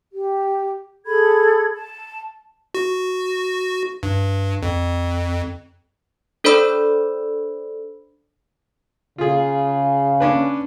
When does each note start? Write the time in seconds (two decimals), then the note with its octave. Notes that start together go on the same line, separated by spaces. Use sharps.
0.13 G4
1.05 G#4 A4 B5 G#6
1.74 A5
2.74 F#4
4.03 G2
4.63 F2
6.44 D4 A4 C5 D5 B5 E6
9.18 C#3 F4 G#4
10.20 C#4 D4 B4